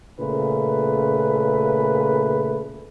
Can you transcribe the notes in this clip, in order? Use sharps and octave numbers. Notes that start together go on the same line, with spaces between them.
A#2 C#3 A3 B4